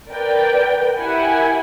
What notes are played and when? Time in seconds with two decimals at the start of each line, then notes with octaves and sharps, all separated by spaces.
0.12 A#4 B4 D5 G5
0.97 E4 G4 A#4 F#5 G#5 B5